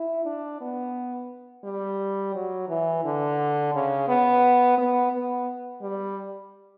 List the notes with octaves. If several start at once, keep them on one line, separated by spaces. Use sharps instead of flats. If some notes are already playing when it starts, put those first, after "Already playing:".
Already playing: E4
D4
B3
G3
F#3
E3
D3
C#3
B3
B3
B3
G3